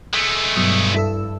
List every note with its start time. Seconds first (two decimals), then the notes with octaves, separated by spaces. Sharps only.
0.14 G#3 A3
0.56 G2 B2 F#3 D#6
0.94 E4 A4 E6